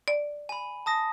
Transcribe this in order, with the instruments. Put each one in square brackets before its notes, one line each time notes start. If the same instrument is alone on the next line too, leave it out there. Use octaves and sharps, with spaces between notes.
[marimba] D5
[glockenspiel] G#5 B5
A5 D#6 A#6